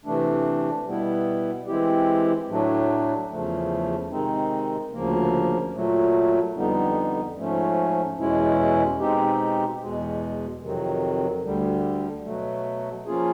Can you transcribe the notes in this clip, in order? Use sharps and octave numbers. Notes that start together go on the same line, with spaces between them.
C3 E3 A3 D4
B2 G3 B3 E4
E3 G#3 C4 E4 G4
A2 F#3 A3 D4
E2 C#3 F3 A3
C3 D#3 G#3 C4 D#4
D2 C#3 F3 A#3
A#2 F#3 A3
F2 D3 G3 B3 D#4
G#2 F3 A3 C#4
E2 B2 G#3 C#4 E4
B2 G#3 C4 D#4 G4
E2 B2 G#3
F2 C3 D#3 F#3
D2 D3 G3
B2 F#3 A3
F3 A#3 C#4 F4 G#4